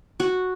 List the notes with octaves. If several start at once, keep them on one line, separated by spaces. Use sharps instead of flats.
F#4